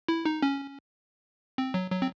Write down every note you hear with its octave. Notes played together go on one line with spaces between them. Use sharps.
E4
D#4
C#4
C4
F#3
F#3
C4